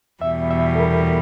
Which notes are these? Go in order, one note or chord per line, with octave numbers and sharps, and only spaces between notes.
E2 B2 G3 E5
E5
A4
A#4